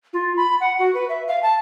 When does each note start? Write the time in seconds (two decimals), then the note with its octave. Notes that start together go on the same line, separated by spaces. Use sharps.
0.13 F4
0.37 B5
0.61 F#5
0.79 F#4
0.94 B4
1.09 E5
1.28 F5
1.43 A5